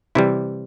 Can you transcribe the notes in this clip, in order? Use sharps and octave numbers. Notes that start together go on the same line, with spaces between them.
C3 E3 G3 E4